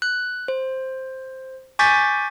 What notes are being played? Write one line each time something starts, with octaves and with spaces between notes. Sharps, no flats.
F#6
C5
G#5 C#6 D6 G6 A6 B6